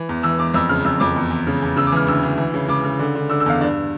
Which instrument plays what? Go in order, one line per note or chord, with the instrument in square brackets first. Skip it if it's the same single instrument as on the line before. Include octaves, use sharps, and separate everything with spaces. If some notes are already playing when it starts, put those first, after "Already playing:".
Already playing: [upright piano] E3
E2
E3 E6
E2 D6
F2 E6
C#3 F6
F2 E6
F2 D6
E2
E2
C#3
E2
C#3 E6
D6
E3 F6
D2 E6
D2
E3
C#3
C#3 D6
C#3
D3
D3
D3 E6
E6
E2 F5
G2 D5